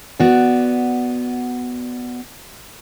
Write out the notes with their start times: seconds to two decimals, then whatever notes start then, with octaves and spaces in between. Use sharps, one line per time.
0.20 B3 F#4 D5